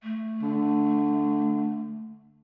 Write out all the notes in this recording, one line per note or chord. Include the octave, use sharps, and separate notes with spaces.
A3
D3